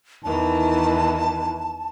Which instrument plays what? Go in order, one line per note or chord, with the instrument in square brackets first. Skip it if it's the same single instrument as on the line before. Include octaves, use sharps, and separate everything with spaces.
[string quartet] E2 D#3 E3 [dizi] A5